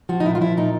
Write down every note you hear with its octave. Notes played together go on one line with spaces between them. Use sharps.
F3 F#4
D#4
A#2 E4
F4
F3 E4
A#2 D#4